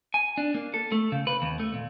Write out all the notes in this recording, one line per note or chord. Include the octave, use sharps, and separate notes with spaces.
G#5
D4
A#3
A4
A3
C#3
B4
D#2
A3
A#2